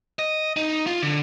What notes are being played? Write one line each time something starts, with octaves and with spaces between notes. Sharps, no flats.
D#5
D#4
F4
D3